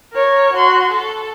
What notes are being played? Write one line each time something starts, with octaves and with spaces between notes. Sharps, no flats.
A#4 C#5
F#4 C6
A4